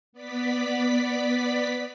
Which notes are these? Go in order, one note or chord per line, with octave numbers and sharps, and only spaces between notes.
B3 D5 B6